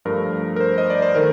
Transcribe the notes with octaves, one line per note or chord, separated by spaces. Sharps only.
G2 F3 A3 A#4
A#4
C5
D#5
D5
C5
D#3 A3 A#4